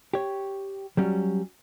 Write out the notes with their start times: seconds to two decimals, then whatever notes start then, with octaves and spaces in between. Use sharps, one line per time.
0.13 G4 C#5
0.97 F#3 G3 C#4